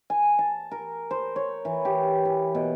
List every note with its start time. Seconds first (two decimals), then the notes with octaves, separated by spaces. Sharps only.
0.10 G#5
0.39 A5
0.71 A#4
1.11 C5
1.36 C#5
1.65 E3
1.85 G4
2.25 E3
2.55 B2